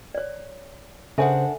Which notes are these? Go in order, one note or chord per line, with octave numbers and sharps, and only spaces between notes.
C#5 D5
C#3 D4 A4 A#4 C5 E5 F#5 G#5